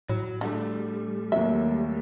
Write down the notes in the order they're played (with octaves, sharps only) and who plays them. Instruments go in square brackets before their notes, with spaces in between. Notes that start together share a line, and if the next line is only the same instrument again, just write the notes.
[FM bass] A2 [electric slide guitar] F#3
[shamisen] D3 [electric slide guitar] G3 A3
[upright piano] D#2 F#3 [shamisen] E5